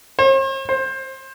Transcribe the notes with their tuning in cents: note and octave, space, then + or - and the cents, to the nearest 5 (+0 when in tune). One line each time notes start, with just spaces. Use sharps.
C5 +45
C5 +20